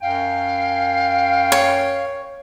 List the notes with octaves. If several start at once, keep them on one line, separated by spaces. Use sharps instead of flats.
F#2 F5 G5
C#5